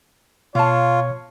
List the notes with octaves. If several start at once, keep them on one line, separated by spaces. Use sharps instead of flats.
B2 F4 C#5 F5 A5